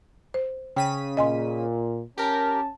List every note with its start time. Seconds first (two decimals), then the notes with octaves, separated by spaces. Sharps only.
0.34 C5
0.76 C#3 G5 B6 D#7
1.17 A#2 D#5 G#5 C6
2.18 C#4 G4 A#4 A5